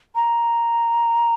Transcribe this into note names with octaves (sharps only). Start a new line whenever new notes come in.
A#5